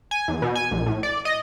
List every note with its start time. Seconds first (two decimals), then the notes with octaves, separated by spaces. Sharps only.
0.11 G#5
0.28 E2
0.42 B2
0.55 G#5
0.71 A#1
0.86 A2
1.03 D5
1.25 D#5